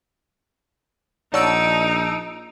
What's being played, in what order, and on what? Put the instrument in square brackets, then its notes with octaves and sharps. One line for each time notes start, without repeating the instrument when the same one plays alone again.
[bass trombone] A#1 [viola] D#4 [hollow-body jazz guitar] C#5 D5 F#5 [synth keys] A5 E6 D7